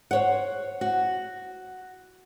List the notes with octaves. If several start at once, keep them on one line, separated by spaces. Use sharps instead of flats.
C5 C#5 F#5
F#4